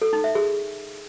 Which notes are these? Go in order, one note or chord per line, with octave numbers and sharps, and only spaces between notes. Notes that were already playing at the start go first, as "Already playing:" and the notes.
A4
D#4
E5
G#4